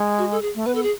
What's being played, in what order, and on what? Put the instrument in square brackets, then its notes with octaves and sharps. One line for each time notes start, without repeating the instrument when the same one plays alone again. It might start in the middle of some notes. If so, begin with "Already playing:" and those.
Already playing: [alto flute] G#3
[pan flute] F#4
A4
G#4
[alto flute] A3
[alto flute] B3 [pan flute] B4
[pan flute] A4
G#4